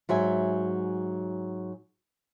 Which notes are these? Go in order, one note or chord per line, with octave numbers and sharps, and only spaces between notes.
G#2 F#3 E5 G#5